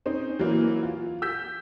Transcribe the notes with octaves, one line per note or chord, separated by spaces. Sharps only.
C4 C#4 D#4
E3 F#3 A#3
F4
E6 G6 B6